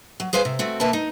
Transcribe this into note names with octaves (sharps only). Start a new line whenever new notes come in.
F#3
G#4 B4 C5 F5 G#5
C3
A3 C4 F#4
E2 C3 A#3 B4 E5 A5
D#4